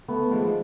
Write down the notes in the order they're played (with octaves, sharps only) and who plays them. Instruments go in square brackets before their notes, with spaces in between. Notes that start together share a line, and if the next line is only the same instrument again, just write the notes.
[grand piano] A3 B3
[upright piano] G#2 F3 G#3